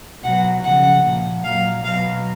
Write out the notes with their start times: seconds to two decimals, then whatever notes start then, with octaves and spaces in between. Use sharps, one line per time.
0.24 B2 F#3 F#5
0.63 C#3 F3 F#5
1.04 A#2 F3
1.44 A#2 F#3 F5
1.84 B2 F#3 F5